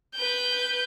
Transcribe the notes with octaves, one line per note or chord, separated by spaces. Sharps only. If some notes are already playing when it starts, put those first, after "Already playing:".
B4 G6